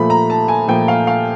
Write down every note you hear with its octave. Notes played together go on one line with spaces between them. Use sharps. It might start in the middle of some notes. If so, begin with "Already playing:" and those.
Already playing: A#2 F3 A3 B5
A#5
A5
G#5
A#2 F3 A3 G5
F5
F5